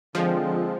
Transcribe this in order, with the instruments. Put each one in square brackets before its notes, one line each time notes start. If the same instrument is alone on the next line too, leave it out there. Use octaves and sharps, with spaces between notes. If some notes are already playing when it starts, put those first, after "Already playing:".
[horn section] D3 G#3 C4 [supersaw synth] F3